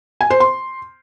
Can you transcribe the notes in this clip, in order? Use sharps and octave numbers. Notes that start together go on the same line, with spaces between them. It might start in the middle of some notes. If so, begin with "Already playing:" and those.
G#5
C5
C6